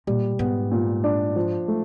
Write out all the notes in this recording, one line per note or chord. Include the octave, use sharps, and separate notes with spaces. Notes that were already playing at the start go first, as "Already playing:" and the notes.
A#2 G3
G#2 B3
A#2
D4
F3
A3